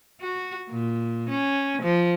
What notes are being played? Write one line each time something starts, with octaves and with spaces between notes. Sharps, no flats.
F#4
A#2
C#4
F3